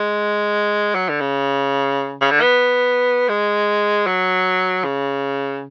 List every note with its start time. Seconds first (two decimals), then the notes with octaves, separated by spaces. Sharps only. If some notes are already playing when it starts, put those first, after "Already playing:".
Already playing: G#3
0.95 F#3
1.09 D3
1.21 C#3
2.21 C#3
2.31 D3
2.41 B3
3.29 G#3
4.06 F#3
4.84 C#3